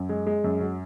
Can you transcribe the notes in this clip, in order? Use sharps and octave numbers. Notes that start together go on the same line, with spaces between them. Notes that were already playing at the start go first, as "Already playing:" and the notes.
Already playing: F#2
G#3
G#3
F#2
F#3